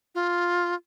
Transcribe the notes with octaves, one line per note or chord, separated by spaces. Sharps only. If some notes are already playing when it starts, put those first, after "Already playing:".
F4